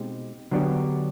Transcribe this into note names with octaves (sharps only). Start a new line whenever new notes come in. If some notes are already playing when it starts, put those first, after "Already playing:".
Already playing: B2 G#3 C4 D#4 G4
D3 F#3 B3 D4 G4